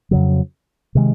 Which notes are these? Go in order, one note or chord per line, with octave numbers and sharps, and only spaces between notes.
F2 C#3 F#3
C3 D#3 G#3